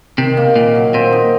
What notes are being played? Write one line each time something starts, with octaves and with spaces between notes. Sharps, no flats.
C3 D#3
A#3
A#2 D#3
F#3
A#2 C4
D#4